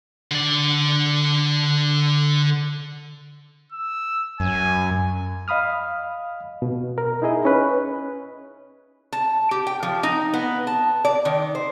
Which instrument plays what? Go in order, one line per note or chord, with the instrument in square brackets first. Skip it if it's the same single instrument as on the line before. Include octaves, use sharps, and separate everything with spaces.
[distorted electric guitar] D3 D5
[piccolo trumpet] E6
[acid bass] F#2 [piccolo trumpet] G#5
[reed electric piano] D#5 F5 B5 D#6 F6
B2
A#4
D#4 E4 G#4 D#5
C#4 B4
[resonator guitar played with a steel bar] A5
G4
G5
F3
D#4
B3
A5
D5
D#3
C5